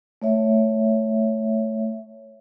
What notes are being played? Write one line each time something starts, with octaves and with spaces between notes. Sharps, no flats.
A3 C#5 E5